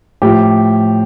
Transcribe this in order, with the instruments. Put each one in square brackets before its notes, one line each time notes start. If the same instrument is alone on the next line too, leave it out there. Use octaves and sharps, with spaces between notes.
[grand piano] A2 F3 G4